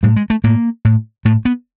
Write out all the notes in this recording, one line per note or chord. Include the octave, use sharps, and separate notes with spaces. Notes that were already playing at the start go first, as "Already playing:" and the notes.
A2 G3
G#3
A3
A2 A#3
A2
A2 A3
B3